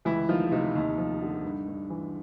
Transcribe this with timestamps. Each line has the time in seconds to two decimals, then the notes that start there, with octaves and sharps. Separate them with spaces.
0.05 C#2 E3 E4
0.29 D#3 F3 F4
0.51 C3 D#3 D#4
0.75 D#2
0.98 F3
1.22 D3
1.45 G2
1.68 G2
1.90 E3